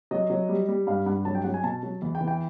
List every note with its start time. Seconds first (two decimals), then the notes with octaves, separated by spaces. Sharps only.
0.11 F#3 D#5
0.30 F#3
0.49 G3
0.69 G3
0.87 G2 F5
1.06 G2 F#5
1.25 F#3 A5
1.35 G5
1.44 F#3 F#5
1.54 G#5
1.63 B2 A5
1.83 F#3
2.02 E2
2.15 G5
2.21 E3
2.28 G5